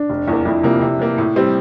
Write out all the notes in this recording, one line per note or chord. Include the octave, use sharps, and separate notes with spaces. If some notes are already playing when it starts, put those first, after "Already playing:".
Already playing: D4
F1
E2 E3 A#3
F2 E4
C3 F3 A#3
C3
E3 A#3
A2
G3 C4 G4